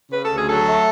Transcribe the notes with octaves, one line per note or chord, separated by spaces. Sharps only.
C#3 B4
A4
D2
G#4
F#3 A4
A3